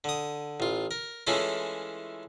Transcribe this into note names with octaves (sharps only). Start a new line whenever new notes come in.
D3 D#6
A1 F4
A#4
E3 G#3 A3 C#4 E4 F4